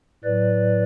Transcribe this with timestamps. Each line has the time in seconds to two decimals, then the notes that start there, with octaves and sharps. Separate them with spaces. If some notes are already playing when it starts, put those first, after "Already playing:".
0.24 A2 F#3 B4 D5